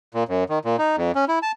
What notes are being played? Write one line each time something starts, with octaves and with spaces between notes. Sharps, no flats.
A#2
F#2
D#3
A#2
D#4
F2
C#4
E4
A5